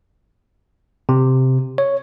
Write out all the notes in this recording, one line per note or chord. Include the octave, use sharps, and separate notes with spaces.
C3
C#5